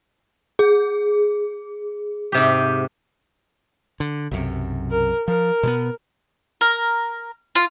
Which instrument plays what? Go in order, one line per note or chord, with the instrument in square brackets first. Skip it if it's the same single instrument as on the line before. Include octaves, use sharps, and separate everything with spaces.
[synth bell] G#4
[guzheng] G#2 C3 G4
[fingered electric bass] D3
B1 F#2 C3
[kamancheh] A#4
[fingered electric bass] F3 [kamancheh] A#4
[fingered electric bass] B2 G3 B3
[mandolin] A#4
F4